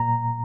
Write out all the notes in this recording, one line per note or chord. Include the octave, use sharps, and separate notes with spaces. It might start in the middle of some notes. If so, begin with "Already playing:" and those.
Already playing: A#2 A#5